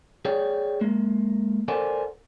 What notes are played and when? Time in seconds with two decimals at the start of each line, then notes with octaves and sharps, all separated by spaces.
0.25 G#4 C#5 D5 G5
0.81 G#3 A#3
1.68 A4 A#4 C5 D5 F#5 G#5